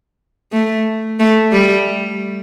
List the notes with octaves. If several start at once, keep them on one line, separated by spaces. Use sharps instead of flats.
A3
A3
G3